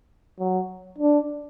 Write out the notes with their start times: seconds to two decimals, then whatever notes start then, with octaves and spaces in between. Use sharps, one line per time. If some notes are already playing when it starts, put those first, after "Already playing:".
0.39 F#3
0.98 D4